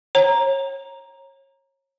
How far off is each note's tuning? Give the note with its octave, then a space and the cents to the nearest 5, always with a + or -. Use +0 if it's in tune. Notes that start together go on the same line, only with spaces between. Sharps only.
C#5 -30 A#5 +5